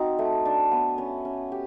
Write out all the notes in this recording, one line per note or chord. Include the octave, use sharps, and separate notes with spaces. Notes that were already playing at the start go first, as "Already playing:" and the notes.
Already playing: C4 D#4 F#4
A3
D4
B3
C#4
C#4
G4